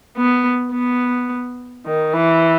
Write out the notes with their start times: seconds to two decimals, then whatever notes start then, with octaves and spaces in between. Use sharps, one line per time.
0.17 B3
0.72 B3
1.86 D#3
2.14 E3